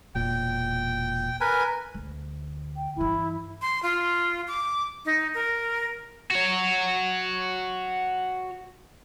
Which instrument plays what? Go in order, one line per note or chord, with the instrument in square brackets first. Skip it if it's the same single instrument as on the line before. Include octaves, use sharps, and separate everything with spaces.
[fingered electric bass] E1 A#2 [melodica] G5
[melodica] A#4 B4 G#5
[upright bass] D2
[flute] G5
[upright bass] G2 E3 [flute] E4
[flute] C6
F4
D6
D#4
A#4
[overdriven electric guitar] F#4 C#5